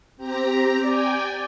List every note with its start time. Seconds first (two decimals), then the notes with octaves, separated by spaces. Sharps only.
0.17 C4 G4 A#5
0.85 D5 G5 G#5